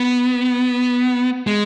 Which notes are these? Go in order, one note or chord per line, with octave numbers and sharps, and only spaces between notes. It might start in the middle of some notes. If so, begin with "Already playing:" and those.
Already playing: B3
G#3